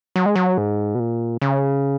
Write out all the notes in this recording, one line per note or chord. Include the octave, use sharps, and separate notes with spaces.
F#3
G#3
F#3
G#2
B2
A#2
C#3